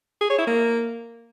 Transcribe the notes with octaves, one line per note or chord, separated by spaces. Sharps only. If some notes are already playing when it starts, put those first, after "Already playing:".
G#4
C#5
E4
A#3